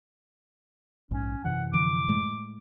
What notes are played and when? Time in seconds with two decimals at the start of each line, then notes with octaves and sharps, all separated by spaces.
1.11 A#1 G#2 C#4
1.44 F#2 C3 E3 F#5
1.73 D3 F3 D6
2.08 A2 G#3 A3